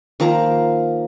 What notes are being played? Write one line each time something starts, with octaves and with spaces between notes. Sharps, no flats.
D#3 F3 A#3 A#5